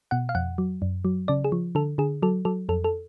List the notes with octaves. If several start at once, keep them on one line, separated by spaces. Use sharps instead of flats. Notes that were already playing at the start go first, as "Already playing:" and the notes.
B2 F#5
F5
F2 F#5
F#3
F#2
F#3
C#3 D5
G#4
F3
D3 A4
D3 G#4
F#3 A4
F#3 A4
F2 A4
A4